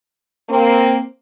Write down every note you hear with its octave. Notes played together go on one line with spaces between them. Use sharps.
A#3 C4